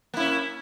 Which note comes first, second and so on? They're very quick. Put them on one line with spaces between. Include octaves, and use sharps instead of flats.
A#3 E4 C#4